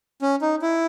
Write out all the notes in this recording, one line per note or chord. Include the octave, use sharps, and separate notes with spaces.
C#4
D#4
E4